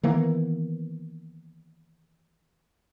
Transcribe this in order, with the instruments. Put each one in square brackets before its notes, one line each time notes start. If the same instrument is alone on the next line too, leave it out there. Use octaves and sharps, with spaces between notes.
[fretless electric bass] D#3 E3 A#3 B3